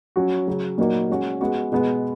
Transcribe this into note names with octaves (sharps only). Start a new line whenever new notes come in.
F#3 C#4 F#4
C#3 F#3 C#4
A#2 F#3 A#3 D#4 F#4
G#3 C#4 F#4
G#3 B3 F#4
B2 G#3 B3